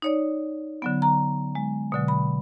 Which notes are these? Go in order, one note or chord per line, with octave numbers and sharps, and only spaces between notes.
D#4 C#5 D5
D3 F#3 B3
A#5
G#3
B2 D3 F#3
B5